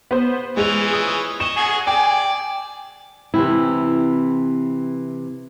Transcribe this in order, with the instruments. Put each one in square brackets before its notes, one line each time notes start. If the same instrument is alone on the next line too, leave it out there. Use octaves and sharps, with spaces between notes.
[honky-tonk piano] B3 C5
[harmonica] E3 F3 C#4 [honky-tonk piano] G#3 F7
[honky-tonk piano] D#6
[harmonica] D#5 C#6 [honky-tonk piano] E7
[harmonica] F#4 G#4 [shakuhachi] G#5
[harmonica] D5 [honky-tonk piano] G5
[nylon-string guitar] C3 E3 C4 E4